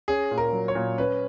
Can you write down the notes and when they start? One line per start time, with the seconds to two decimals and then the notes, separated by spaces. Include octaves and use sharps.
0.08 C#4 G#4
0.31 A#2
0.38 A#4
0.52 F#3
0.68 C#5
0.75 A#2
0.98 C#4 B4